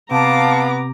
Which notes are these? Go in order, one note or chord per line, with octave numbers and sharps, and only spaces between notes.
C3 B3 F5 A5 A#5 D6